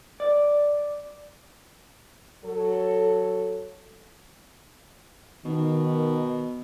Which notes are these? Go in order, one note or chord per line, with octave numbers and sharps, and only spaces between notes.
D5
F#3 A4
B2 D#3